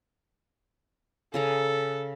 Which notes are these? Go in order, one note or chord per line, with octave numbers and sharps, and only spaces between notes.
C#3 G#4 A4 A#5